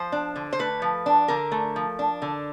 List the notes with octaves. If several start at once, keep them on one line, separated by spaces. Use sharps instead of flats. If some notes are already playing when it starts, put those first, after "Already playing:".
Already playing: F3 C5
D4
D3
C5
A3 B4
F3
D4
D3 A#4
A3
F3
D4
D3